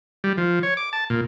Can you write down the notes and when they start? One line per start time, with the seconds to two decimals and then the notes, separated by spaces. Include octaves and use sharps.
0.24 G3
0.38 F3
0.63 C#5
0.77 D6
0.93 A5
1.10 A#2